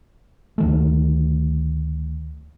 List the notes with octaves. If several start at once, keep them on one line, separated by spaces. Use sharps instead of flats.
D2 D#3 A3